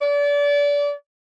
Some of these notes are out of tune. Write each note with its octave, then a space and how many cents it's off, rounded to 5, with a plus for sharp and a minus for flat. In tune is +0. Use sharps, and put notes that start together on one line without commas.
D5 -30